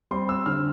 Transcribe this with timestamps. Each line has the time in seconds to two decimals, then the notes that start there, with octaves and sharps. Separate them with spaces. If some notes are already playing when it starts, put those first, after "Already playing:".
0.11 G3 C4 C6
0.29 E6
0.46 D3 F6